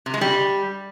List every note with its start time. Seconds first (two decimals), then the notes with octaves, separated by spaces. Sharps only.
0.06 C3
0.14 G#3
0.21 G3